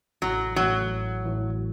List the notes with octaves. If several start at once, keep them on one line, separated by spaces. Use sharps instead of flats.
A1 F#3
A2 E3 F#3
A1
A2 E3